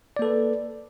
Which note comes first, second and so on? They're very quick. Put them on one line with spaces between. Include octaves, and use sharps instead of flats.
D5 A#3 A4 B4